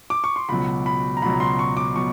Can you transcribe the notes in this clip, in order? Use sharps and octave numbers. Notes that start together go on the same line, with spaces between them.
D6
C#6
C6
C#2 B2 F#3 B5
B5
A#5
C#2 B2 F#3 B5
C6
C#6
D6
B2 F#3 C#6